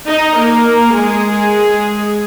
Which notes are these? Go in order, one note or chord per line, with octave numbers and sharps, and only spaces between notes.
D#4 D#5
A#3 A#4
G#3 G#4